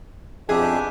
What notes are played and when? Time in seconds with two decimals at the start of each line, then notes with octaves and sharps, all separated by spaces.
0.49 F2 G#2 B2 D4 G4 G#4 E5 G#5